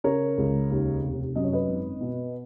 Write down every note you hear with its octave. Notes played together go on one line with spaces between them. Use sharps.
C#3 A#4 C#5
C#2
D#2
F1
F#2 D#5
C#5
B4 D#5
G#1
B2